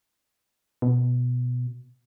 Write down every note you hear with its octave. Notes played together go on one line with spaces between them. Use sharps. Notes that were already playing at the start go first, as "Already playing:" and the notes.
B2